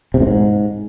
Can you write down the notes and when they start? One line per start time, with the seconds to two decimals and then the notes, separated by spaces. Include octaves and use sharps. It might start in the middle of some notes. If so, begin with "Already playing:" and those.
0.14 C3
0.21 A2
0.27 G#2